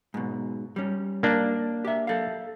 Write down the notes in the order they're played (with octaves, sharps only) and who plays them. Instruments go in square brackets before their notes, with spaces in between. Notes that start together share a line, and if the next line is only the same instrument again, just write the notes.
[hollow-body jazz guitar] G#2 B2
G3 C#4
[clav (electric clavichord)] A#3 D4
[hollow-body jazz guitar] G4 E5
A4 F5